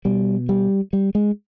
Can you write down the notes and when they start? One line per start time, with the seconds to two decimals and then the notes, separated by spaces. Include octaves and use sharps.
0.05 B2 G3
0.49 G3
0.93 G3
1.15 G#3